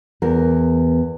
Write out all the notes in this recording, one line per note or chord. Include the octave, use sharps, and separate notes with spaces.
E2 A#4